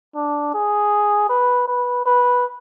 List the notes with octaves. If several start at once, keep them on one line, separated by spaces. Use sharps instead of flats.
D4
G#4
B4
B4
B4